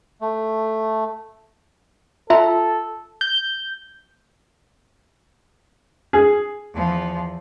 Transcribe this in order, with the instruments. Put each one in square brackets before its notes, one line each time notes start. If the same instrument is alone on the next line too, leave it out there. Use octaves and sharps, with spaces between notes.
[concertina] A3
[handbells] F4 E5 A#5 [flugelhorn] A4
[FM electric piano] G6
[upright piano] G#4
[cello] E2 F3